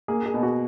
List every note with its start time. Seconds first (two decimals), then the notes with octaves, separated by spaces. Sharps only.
0.08 A#3 G#4
0.26 G#4
0.34 B2
0.43 F#4